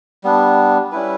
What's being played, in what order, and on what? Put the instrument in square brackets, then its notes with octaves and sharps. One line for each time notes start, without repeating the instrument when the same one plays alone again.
[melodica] G3 B3 D4
G3 C#4 E4 B4